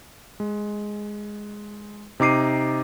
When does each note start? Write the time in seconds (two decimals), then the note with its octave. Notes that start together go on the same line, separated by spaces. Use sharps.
0.40 G#3
2.20 C3 D#4 D6 C7 D#7